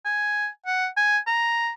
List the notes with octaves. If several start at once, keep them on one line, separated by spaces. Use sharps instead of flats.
G#5
F#5
G#5
A#5